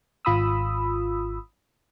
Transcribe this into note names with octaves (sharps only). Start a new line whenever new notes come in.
G#1 F4 B5 D#6 E6